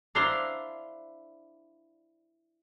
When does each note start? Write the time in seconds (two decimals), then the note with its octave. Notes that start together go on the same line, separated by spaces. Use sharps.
0.15 D4 E4 C5 F5 A#5 C6